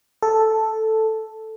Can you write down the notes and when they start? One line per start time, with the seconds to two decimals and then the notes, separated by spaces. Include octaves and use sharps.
0.22 A4